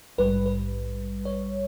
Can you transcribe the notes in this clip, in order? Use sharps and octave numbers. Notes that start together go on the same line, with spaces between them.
A#1 G#2 G3 B4
B4
C#5